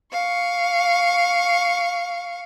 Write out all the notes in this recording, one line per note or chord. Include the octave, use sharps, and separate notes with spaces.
F5 C#6